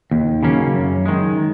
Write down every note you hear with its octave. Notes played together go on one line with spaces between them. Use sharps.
D#2
C#3 F#3 A#3 C#4
F#2
D#3 G#3